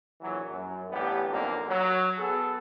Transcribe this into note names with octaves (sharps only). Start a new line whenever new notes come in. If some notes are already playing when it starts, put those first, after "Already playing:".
A#1 E3 F#3
F#2
A1 G2 B3 G4
B1 F2 D3 A#3
F#3
B3 G#4 A4